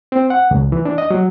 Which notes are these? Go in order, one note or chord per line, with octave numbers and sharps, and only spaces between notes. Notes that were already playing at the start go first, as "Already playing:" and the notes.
C4
F#5
C#2
E3
D4
D#5
F#3